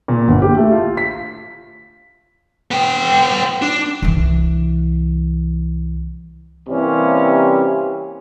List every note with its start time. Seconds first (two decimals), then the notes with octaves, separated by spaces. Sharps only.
0.08 A#2
0.28 G1
0.42 G4
0.57 A3
0.72 F4
0.97 B6
2.71 B3 G5
3.62 D4
4.02 C2 E3
6.69 C3 E3 G3 A#3 C#4